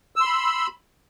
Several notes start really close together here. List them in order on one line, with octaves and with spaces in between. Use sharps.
E6 C6 B5